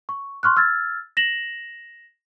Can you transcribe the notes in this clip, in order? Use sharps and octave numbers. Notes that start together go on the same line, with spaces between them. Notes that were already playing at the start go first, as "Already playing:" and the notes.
C#6
C6 C#6 F6 F#6
E6 F6 G#6 A6
A#6 E7 F#7